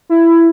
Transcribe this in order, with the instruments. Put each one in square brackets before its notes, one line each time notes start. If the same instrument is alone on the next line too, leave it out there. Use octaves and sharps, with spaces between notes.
[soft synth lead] E4